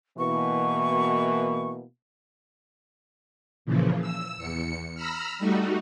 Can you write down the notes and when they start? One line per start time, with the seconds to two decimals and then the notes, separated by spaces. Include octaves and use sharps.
0.18 B2 E3 A#3 C#6
3.65 A#2 C#3 E3 F3
4.01 E6
4.38 E2 C#7
4.95 A#5 B5 E6 F6
5.39 G3 A3 D#4 F#4